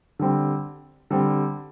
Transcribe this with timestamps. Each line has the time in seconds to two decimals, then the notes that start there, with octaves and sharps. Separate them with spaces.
0.19 D3 G3 C4
1.10 D3 G3 C4